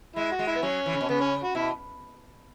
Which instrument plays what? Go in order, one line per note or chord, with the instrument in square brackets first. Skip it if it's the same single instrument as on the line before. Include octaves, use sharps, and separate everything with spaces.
[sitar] G#3 [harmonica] E4
[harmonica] F#4
[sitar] G#3
[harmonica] E4
B3
[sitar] F#3 [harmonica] C#4
[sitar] E3
C#3
B2
[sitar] C#3 [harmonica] B3
[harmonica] C#4
F#4
[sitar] B2 [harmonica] E4